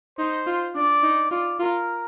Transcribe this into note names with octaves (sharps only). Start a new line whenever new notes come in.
D#4 C5
F4
D4 D5
D#4
F4 D5
F4 A#4